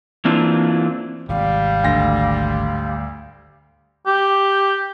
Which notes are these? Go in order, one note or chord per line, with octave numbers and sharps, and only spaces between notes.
E3 A#3 C4 D4 E4 F4
G#1 C3 G3 F5
D2 A#6
G4